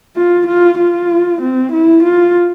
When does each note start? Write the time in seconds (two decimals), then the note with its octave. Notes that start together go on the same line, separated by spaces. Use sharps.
0.16 F4
0.47 F4
0.78 F4
1.41 C4
1.72 E4
2.03 F4